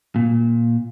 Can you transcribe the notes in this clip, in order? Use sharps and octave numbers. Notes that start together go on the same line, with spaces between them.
A#2